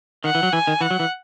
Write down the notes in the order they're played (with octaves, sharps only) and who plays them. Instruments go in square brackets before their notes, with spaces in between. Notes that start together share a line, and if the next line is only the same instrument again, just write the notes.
[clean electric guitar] D#3 [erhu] F#5
[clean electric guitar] E3
F#3
[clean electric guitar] E3 [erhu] G#5
[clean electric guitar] D#3
[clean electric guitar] E3 [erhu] F#5
[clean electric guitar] F#3
E3